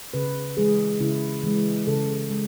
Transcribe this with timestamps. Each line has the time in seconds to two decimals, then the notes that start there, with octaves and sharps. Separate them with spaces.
0.14 C#3 B4
0.57 E3 G#3 G#4
1.00 C#3 E4
1.43 E3 G#3
1.87 C#3 A4
2.30 G#3